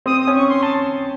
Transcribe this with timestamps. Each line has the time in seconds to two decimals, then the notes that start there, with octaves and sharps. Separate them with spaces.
0.06 C4 D#6
0.21 D#6
0.27 C#4
0.35 C#6
0.49 C6
0.63 A5